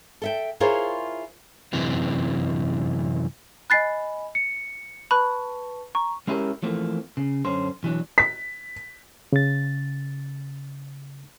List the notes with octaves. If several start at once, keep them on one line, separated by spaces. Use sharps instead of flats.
A4 E5 G5
E4 F4 G#4 A#4 C5 C#5
F#2 C3 E3 G#3
D#5 G#5 B5 F#6 A6 C7
C#7
B4 A5 B5 C#6 F#6
A#5 C#6
G#3 C#4 E4 G4 G#4 A#4
E3 F3 A3 A#3 C4
C#3
F#2 D3 C#4 C5
B1 E3 F#3 D4
B6
C#3 A6